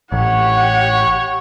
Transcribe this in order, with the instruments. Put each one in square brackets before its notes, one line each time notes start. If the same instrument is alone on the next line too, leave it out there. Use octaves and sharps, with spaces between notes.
[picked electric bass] A1 [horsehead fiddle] G4 F#5 [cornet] C#5